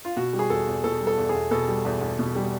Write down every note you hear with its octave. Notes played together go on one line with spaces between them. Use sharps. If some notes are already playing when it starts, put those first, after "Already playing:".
F4
B2 F#4
G3
G#4
E2 A4
E2
B2 A4
G3
A4
E2
G#4
E2
B2 A4
G3
E2
E2
B2
G3